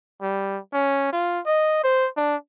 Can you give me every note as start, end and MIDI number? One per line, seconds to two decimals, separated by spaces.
0.22 0.59 55
0.74 1.12 61
1.12 1.40 65
1.46 1.80 75
1.84 2.08 72
2.17 2.36 62